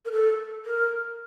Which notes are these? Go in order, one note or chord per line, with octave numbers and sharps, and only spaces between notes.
A#4
A4
A#4